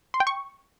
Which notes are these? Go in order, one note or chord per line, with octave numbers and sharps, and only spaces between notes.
C6
G5
C#6